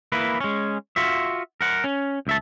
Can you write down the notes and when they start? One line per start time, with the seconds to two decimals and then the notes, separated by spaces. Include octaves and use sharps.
0.12 A#3 E4 B4
0.41 G#3 C#4
0.96 F4 F#4 E5
1.61 A#4 F#5
1.84 C#4
2.27 C#2 E5 A5